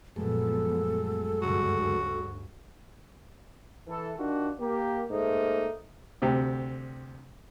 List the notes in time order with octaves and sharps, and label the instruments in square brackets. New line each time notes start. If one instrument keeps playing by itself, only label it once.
[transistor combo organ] F#2 G#3 A3 [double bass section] A#2 F3 B3 [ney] A4
[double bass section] D2 G2 C#3 [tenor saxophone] F#4
[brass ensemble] E3 A4
D#3 D4 F4 F#4
A#3 G4
G#2 A3 A#3 D#4
[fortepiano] D2 C3 G4